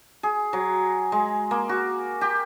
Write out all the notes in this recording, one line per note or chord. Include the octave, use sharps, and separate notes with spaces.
G#4
F#3
G#3
A#3
F#4
G4